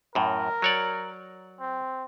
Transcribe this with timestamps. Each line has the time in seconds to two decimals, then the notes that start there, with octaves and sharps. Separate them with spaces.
0.15 F#2 A2 A#4
0.62 F#3 C#5 D5
1.60 C4